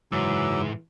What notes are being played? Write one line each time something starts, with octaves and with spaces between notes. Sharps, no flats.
F#1 G#2 C3 E3 F#3 D6 E6